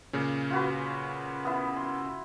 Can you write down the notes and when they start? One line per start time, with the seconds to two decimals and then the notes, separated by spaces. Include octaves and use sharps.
0.13 A#2 C#3 C#4
0.51 F4 F#4 B4
1.45 B3 E4
1.76 C6